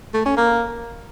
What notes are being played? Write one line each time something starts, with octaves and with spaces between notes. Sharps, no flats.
A3
C#4
A#3